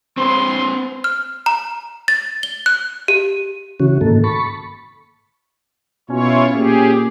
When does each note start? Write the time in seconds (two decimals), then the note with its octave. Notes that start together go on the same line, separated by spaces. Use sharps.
0.17 C4 B4 C6
1.04 F6
1.46 A#5
2.08 A6
2.43 G7
2.66 F#6
3.08 G4
3.80 C#3 E3 C#4 F#4
4.01 G#2 D#3 A#3 A4
4.24 A5 B5 C#6
6.10 B2 C#4 E4 F4 C#5
6.54 A#2 G4 G#4